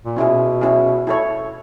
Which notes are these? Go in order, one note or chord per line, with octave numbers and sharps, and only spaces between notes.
A#2
B2 C#4 E4 G#4
C#4 E4 G#4
E4 A4 C#5